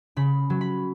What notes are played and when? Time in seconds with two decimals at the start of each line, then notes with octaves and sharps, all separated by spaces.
0.16 C#3 B5
0.50 F#3
0.61 B5